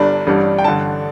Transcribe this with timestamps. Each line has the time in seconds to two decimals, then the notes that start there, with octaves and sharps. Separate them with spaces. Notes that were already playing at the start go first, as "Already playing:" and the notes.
Already playing: G1 G2 G3 D4 B5
0.27 A1 G2 G3 D4
0.58 G5
0.64 A1 G2 D3 A5